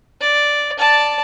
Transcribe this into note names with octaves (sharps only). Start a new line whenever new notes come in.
D5
D5 A5